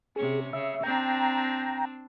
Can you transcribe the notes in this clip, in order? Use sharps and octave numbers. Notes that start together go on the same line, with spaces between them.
C3 C#4 G#4
C#3 E5
C4 D4 G5 A#5